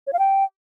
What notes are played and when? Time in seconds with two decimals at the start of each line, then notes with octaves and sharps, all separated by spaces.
0.07 C#5
0.13 F5
0.19 G5